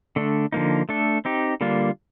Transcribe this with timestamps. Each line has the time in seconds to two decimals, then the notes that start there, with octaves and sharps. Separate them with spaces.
0.16 D3 A3 D4
0.52 D3 F3 A#3 D#4
0.89 A3 D4 A4
1.25 C4 D#4 G4
1.61 D3 G3 A#3 D4 F4